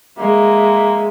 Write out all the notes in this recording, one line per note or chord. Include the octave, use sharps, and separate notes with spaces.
G#3 A#3 E5